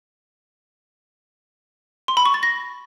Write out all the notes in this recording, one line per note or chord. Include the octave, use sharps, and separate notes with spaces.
C6
B5
C#6
A6
A#6